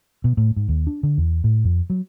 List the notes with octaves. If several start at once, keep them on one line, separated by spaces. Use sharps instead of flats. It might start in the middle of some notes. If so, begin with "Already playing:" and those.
B2
A2
G#2
D#2
D4
D3
E2
A2
F2
F#3